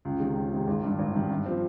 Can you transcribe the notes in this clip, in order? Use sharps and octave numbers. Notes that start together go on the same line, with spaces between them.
C#2
C3 D#3 G#3
C#2
C3 D#3 G#3
G#1
G2 D#3
G#1
G2 D#3
G2
F3 C4